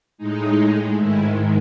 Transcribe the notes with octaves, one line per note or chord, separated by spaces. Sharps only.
A2 G#3 D#4
G#2 D#3 G#3 E4